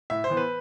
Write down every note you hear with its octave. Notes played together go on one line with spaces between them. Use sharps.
A2 E5
C5
E3 B3
B4